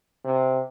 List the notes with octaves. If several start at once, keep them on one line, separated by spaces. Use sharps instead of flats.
C3